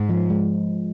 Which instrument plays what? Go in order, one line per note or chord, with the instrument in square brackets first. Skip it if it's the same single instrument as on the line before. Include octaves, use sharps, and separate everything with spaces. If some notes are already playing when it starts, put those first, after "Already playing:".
Already playing: [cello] G#2
[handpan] F3
G#3